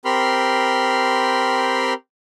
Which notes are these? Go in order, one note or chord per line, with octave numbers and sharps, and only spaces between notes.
C4 G4 A#4 B5 C6 F6